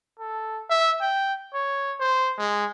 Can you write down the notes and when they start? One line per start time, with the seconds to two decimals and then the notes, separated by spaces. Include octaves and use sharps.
0.19 A4
0.70 E5
1.01 G5
1.54 C#5
1.99 C5
2.38 G#3